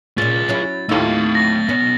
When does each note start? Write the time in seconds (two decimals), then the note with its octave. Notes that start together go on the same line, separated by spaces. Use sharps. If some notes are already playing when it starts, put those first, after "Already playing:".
0.18 A#2 C#4 F4 G#4 A6
0.49 F#3 C#4 E4
0.89 D#2 A2 A3 D#4 F4 F5 E6
1.35 A#6
1.69 B1 B3 C#4